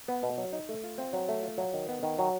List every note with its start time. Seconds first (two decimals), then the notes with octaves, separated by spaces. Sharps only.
0.08 B3
0.23 B2
0.38 F#3
0.53 D#4
0.69 A3
0.84 F4
0.98 C4
1.13 F#3
1.29 A3
1.43 F4
1.58 F#3
1.74 D#3
1.88 B3
2.03 D#3
2.19 F#3